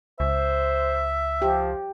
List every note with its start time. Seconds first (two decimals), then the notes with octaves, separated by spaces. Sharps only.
0.20 C#2 C5 E5
1.42 F3 G4